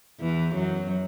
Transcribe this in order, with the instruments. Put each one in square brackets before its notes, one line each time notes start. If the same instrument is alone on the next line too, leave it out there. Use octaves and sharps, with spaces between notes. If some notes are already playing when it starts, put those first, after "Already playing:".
[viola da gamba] E2 E3
F#2 F#3